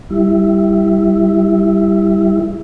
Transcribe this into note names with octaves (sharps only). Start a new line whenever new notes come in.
G3 E4